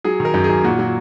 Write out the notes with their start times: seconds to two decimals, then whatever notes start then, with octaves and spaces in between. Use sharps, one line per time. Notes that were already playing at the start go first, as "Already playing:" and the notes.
0.04 F#3 G#4
0.20 D#3
0.25 A#4
0.34 F#2
0.44 G#4
0.50 F#2
0.64 A#2 F#4
0.79 F#3